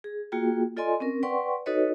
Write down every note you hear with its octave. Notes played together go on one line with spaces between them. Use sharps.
G#4
A#3 F4 F#4 G#4 G5
F4 A4 D5 D#5 G#5 C6
C4 C#4 A#4
B4 D5 F#5 G5 C6 C#6
D#4 F#4 A4 B4 C#5 D#5